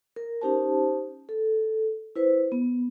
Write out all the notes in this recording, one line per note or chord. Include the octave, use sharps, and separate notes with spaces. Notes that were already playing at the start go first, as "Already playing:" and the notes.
A#4
C#4 D#4 G4 C5 A5
A4
E4 B4 C5
B3